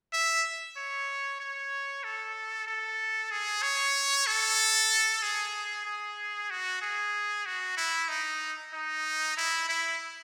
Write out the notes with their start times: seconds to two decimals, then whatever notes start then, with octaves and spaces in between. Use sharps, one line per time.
0.13 E5
0.77 C#5
1.40 C#5
2.04 A4
2.67 A4
3.31 G#4
3.63 C#5
4.27 A4
5.22 G#4
5.86 G#4
6.50 F#4
6.82 G#4
7.46 F#4
7.77 E4
8.09 D#4
8.73 D#4
9.37 E4
9.69 E4